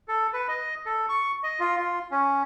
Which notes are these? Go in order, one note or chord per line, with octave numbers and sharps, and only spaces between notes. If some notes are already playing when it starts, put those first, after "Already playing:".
A4
B4
D#5
A4
C#6
D#5
F4
F4
C#4